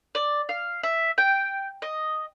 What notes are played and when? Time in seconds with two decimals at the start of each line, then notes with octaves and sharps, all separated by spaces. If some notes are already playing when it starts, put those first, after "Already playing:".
0.15 D5
0.49 F5
0.83 E5
1.18 G5
1.82 D#5